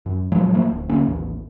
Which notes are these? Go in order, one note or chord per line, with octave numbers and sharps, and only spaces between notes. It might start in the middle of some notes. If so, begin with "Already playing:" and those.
F#2
A#2 F3 F#3 G#3
G#2 F3 A3 A#3
D1
D#2 D3 A#3 C#4
A1 D#2